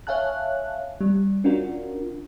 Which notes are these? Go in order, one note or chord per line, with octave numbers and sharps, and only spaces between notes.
C#5 E5 F5 G#5 A5 F#6
G3
C#4 D4 F4 F#4 A#4